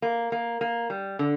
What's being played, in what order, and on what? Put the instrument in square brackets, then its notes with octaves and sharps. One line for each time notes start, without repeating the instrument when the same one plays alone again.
[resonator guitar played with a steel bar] A#3
A#3
A#3
G3
D3